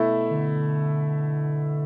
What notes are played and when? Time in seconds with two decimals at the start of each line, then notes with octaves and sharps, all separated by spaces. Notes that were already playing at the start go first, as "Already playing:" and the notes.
Already playing: B2 A3 E4
0.29 D3